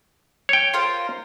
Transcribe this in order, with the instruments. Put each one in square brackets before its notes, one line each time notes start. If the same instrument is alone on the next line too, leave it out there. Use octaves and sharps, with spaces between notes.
[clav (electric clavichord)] C#5 G5
[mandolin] F4 A#4 C5